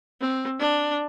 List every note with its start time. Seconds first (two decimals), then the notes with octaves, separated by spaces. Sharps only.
0.20 C4
0.59 D4